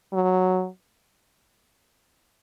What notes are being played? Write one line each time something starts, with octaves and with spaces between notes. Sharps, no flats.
F#3